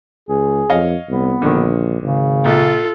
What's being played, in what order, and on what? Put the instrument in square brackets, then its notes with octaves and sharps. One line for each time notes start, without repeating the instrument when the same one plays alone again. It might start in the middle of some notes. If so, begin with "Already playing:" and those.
[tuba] C#2 [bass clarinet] G#4
[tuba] F2 [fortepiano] C#5 D#5 F5
[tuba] C2 [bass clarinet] B3
[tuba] A#1 [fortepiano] D3 D#3
[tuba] G#1 [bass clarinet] C#3
[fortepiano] A#1 [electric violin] F4 A4